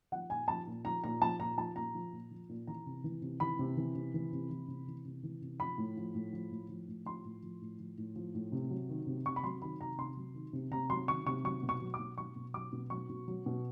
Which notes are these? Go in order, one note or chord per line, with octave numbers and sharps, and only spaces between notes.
F3 F#5
A#2 G#5
F3 A5
A#2
F3 A#5
A#2 A#5
F3 A5
A#2 A#5
F3 A5
A#2 A#5
F3
A#2
F3
A#2
E3 A#5
C3
E3
C3
E3 B5
C3
E3
C3
E3
C3
E3
C3
E3
C3
E3
C3
F3 B5
A2
F3
A2
F3
A2
F3
A2
F3 C6
A2
F3
A2
F3
A2
F3
A2
C3
F#3
D#3
C3
C3 C#6
B5
F#3 C6
D#3 B5
C3 A#5
C3 C6
F#3
D#3
C3
C3 A#5
F#3 C6
D#3 C#6
C3 C#6
F#3 C#6
B2
C#6
F#3
D6
B2
F#3 C#6
B2
F#3 D6
B2
F#3 C#6
B2
F#3
B2